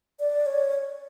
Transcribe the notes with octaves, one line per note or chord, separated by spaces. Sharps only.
D5
C#5